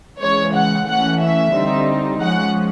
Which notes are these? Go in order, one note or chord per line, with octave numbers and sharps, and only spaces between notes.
C#3 E3 G#3 C#5
F#5
E3 A3 C#4 F#5
E5
D3 G3 C4 D#4
F3 G#3 C#4 F#5